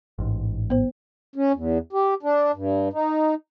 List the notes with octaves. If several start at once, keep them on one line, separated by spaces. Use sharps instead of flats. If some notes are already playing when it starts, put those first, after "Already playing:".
A1 G#2
B3 C5
C#4
E2
G4
D4
G2
D#4